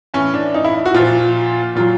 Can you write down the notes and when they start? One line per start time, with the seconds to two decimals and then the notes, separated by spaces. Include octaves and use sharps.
0.14 A2 E3 C#4
0.34 D4
0.54 D#4
0.64 E4
0.86 F#4
0.94 A#2 F4
1.00 F3
1.75 A#2 F#3 F4